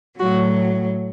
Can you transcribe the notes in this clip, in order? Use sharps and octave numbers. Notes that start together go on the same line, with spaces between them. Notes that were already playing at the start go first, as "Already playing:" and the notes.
A2 F#3 F#4